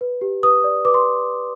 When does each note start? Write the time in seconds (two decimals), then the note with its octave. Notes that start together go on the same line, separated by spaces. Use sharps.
0.01 B4
0.21 G4
0.43 B4 D#6
0.64 D5
0.85 B4 D6
0.94 C6